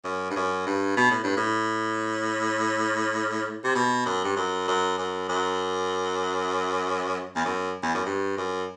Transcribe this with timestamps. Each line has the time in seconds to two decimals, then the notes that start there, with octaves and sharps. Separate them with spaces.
0.05 F#2
0.31 G2
0.36 F#2
0.66 G2
0.97 B2
1.11 A2
1.24 G2
1.37 A2
3.64 C3
3.75 B2
4.06 F#2
4.24 G2
4.36 F#2
4.68 F#2
4.98 F#2
5.29 F#2
7.36 E2
7.45 F#2
7.82 E2
7.95 F#2
8.06 G2
8.37 F#2